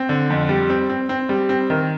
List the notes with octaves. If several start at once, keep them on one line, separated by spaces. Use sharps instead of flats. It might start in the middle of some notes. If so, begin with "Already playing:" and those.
Already playing: C4
D3
F2
G3
C4
C4
C4
G3
C4
D#3